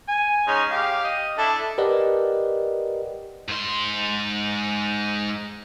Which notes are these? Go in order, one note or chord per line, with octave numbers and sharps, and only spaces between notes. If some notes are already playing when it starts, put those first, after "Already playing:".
G#5
G#3 C#4 D#4
G4 F5
D#5
D4 E4 A4
G4 A#4 B4 D5 D#5 F#5
G#2 C6